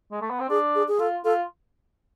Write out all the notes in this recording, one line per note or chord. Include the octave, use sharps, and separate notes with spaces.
G#3
A3
B3
C4
D4 G#4
G#4
G#4
F4 A4
F4 A4